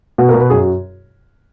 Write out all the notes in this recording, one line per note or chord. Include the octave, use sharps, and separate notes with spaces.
B2 F#4
A#4
B2
B4
F#2 G#4
F#4